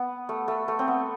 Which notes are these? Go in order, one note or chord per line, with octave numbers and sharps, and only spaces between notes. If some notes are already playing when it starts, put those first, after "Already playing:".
Already playing: B3
A3
A3
A3
C4
B3